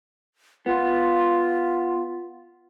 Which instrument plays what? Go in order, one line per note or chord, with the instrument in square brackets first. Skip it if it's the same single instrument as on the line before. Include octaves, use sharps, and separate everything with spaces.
[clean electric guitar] B3 [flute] F4